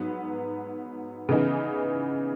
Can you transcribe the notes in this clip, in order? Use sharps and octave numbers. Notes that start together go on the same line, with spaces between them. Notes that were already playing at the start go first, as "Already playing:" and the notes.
Already playing: G#2 F#3 B3
C#3 E3 B3 D#4 G#4